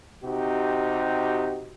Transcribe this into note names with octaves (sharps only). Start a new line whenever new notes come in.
C3 D#4 F#4 G4